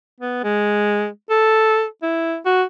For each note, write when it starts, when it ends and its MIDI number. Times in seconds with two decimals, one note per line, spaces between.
0.20 0.40 59
0.43 1.08 56
1.30 1.85 69
2.02 2.37 64
2.45 2.63 66